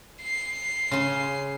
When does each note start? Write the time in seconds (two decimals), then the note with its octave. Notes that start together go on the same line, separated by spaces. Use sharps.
0.22 C7
0.91 C#3 C6